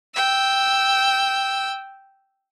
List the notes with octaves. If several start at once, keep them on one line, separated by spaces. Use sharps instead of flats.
G5 E6